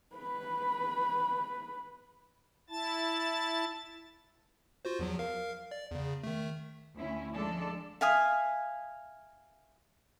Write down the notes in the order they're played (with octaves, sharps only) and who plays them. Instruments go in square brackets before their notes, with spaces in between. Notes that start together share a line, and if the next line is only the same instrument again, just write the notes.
[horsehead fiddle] B4 B5
[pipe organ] E4 A5 A6
[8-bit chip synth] F4 F#4 C5
E2 F3 F#3
A#4 F5
D5
E2 C#3
D#3 A3
[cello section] D2 C#4 E4
F3 G#3 D4 A4 D5
[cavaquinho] E5 F5 G#5 D#6